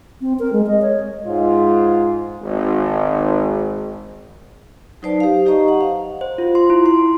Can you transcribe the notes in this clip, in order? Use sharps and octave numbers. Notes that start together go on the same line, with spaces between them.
C4
A#4
G#3
D#5
C#5
G#2 F4
G#1
F#3 D#4 B4 C5 D5 A5
G4 F5
D#4 G4 C5 D#5 A#5 C#6
F#5
F5
C5
F4
C6
E4
C6